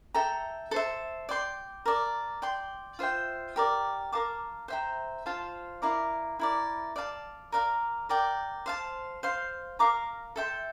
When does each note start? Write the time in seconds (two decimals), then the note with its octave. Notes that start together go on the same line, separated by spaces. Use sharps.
0.15 A4 E5 G5 A#5
0.71 A4 C5 E5
1.29 D5 G5 C6
1.86 A#4 D5 A5
2.42 D5 G5 C6
2.99 F4 C5 E5 G5
3.56 G4 A#4 D5
4.12 A#4 F5 A5 D6
4.68 C5 E5 G5 A#5
5.26 F4 C5 F5 A5
5.82 E4 A#4 D5 F5
6.39 E4 A#4 D5
6.96 D5 F5 A5
7.52 A#4 D5 F5 A#5
8.09 A#4 D5 G5
8.66 C5 F5 A5
9.23 C5 F5 C6
9.79 A#4 F5 A#5 D6
10.36 A4 E5 G5 C6